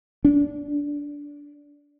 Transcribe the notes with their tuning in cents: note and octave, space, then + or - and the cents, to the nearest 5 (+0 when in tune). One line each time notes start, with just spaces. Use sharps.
D4 -15